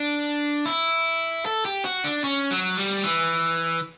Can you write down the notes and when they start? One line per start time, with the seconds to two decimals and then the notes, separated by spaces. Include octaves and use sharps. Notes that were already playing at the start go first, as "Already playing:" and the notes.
Already playing: D4
0.66 E4
1.45 A4
1.65 G4
1.85 F#4
2.04 D4
2.24 C#4
2.51 F#3
2.77 G3
3.03 E3